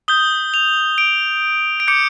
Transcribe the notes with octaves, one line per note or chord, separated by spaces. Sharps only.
D#6 G6 G7
F7
D7
D7
D6 G6 C#7